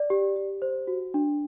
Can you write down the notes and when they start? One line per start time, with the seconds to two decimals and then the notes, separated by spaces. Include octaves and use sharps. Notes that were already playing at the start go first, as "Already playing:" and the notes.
Already playing: D5
0.10 G4
0.36 G4
0.62 C5
0.87 F#4
1.14 D4